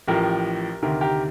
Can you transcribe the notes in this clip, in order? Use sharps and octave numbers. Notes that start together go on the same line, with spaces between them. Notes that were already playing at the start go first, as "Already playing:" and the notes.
A1 A2 F3 G4 A#4
D2 C3 D#3 G4 A#4
G4 A#4